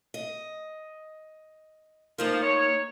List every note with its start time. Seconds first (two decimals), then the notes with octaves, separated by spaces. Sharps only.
0.14 D#5
2.18 F3 A#3 D#4 A#4
2.42 C#5